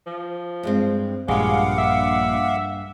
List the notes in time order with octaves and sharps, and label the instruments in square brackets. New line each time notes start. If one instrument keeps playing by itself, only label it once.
[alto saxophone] F3
[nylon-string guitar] G2 G#3 C4
[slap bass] A#1 A#2 [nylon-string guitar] G2 G4 [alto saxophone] G#3 [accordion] F5 F#5 D6
[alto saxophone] E5